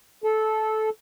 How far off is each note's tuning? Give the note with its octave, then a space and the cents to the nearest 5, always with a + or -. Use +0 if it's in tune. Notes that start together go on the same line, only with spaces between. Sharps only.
A4 -15